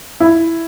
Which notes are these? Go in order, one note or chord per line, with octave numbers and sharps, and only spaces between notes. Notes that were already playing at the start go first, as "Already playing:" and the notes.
E4